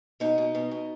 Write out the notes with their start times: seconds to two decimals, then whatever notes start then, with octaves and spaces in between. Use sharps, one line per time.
0.20 B2 D#4
0.38 B2
0.55 B2
0.71 B2